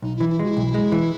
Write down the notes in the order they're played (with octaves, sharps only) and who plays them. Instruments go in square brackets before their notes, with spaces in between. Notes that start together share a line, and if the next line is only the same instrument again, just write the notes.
[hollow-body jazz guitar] B1 [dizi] D#4
[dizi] E4
[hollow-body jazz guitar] E3
[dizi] E4
[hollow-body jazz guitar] G#3 [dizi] F#4
[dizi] E4
[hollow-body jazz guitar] B1
G#3
E3